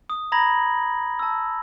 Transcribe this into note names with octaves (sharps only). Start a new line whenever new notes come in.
D#6
A#5 B5 G#6 A#6 F#7
A5 E6